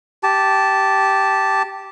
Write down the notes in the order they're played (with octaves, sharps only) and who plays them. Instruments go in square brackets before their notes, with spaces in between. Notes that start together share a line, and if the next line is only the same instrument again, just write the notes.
[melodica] G4 A5